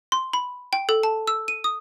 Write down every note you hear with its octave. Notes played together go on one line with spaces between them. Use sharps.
C6
B5
G5
A4
A5
E6
D#7
D#6